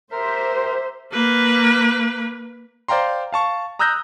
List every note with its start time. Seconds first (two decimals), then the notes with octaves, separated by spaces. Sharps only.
0.12 G4 A#4 C5 E5
1.12 A#3 B4
2.88 C5 D5 F5 G5 A#5 C6
3.32 F5 A5 C#6
3.79 A#5 D#6 E6 F#6 G6 A#6